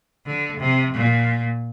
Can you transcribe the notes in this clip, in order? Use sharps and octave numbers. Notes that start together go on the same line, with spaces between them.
D3
C3
A#2